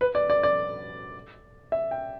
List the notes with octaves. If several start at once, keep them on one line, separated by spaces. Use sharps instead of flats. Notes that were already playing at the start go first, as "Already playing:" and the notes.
B4
D5
D5
D5
E5
G5